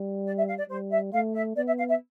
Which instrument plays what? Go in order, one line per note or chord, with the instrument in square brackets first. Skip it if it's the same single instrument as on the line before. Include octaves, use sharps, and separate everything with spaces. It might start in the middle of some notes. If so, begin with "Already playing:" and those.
Already playing: [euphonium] G3
[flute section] D5
E5
F5
D5
[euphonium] G3 [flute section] C5
[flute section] E5
[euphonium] A3 [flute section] F5
[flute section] E5
[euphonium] B3 [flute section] D5
[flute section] E5
F5
E5